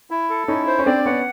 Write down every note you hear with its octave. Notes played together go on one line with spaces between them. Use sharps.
E4
A4
C#4 D#4 E4
C5
C#4
C4 D4 D5
B3 C#4 F#5